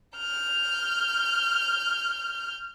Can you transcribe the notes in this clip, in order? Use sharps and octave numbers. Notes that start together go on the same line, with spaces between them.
F6 G6